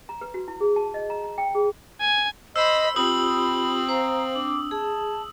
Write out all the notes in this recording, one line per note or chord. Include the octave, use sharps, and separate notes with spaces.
A#5
B4
F#4
E4
G#4
A5
D#5
A#5
A#5
G5
G#4
G#5
C5 D#5 B5 E6
C4 F4 G4 B5 D#6 F#7
C5 F5 A#5
D4 D6
G#4 A5